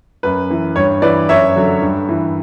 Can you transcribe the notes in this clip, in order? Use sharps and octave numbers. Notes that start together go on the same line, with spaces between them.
F#2 B4
E3
G2 C#5
E3 B4 D5
F#2 C#5 E5
D3 F#3
G2
E3